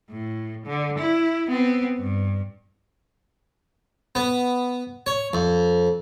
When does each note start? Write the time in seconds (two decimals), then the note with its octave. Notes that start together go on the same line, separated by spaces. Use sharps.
0.10 A2
0.66 D3
0.98 E4
1.48 B3 C4
1.97 G2
4.15 B3
5.06 C#5
5.33 F2